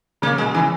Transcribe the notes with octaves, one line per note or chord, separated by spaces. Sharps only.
C#3 A#3
B2 G#3
C#3 E3